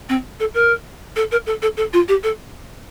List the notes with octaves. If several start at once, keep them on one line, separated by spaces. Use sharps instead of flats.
C4
A4
A#4
A4
A#4
A4
A4
A4
F4
G4
A4